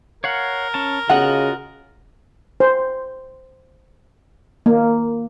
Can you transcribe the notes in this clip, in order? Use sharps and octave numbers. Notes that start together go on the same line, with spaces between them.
A#4 C#5 F5 F#5
C#4 A5
C#3 F4 F#4 D#5 F#5
C5
A#3